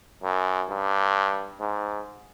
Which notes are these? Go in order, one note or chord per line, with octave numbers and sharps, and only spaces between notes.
F#2
G2
G#2